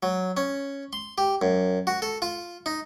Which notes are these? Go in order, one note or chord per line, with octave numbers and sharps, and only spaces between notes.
F#3
C#4
C6
G4
F#2
F#4
A4
F4
D#4